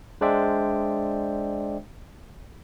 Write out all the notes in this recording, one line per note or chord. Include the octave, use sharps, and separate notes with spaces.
G#3 D4 C5 D5 E5 G5